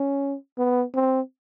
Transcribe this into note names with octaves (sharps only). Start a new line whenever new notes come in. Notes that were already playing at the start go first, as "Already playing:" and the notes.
Already playing: C#4
B3
C4